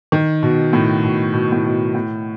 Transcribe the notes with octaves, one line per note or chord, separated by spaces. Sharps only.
D#3
B2
A2
B2
B2
A2
B2
A2